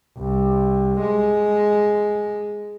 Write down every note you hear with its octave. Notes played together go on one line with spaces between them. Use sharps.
C2
G#3